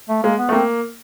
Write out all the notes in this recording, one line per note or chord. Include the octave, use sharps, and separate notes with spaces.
A3
G#3 A#3
B3
A3
A#3 C4